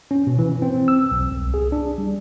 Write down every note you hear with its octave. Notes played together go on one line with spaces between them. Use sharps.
C#4
B2
E3
C4
E6
B1
C2
G#4
D4
G3